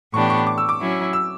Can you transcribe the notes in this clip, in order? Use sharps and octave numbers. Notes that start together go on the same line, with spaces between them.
A2 E3 B3 D4 G4 C#6
C#6
D6
E6
D6
F#3 C#4 E4
E6